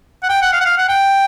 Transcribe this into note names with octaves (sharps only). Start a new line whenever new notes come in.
F#5
G5
F#5
F5
F#5
F5
F#5
G5